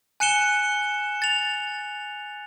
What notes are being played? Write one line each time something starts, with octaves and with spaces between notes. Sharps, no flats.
G#5 F#6 C#7 E7 G7
A6 F7